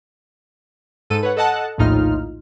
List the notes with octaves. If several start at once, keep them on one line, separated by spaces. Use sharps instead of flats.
G#2 A4 D#7
B4 C#5 F#5
A4 D#5 F#5 A5 F#6
A#1 D#2 A2 D#4 F4 F6